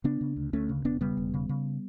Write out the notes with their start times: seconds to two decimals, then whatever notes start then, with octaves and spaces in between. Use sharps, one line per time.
0.04 C#3 B3 D4
0.21 C#3
0.36 D2
0.53 D2 A3 C#4
0.69 C#3
0.84 E1 B3 D4
1.01 C#3 G3 B3
1.17 E1
1.34 C#3
1.49 C#3